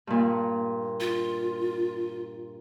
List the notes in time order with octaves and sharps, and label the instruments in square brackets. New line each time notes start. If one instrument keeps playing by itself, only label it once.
[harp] G2 A#2
[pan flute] F4